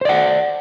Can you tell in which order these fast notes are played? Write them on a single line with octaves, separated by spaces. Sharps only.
C5 D5 F#5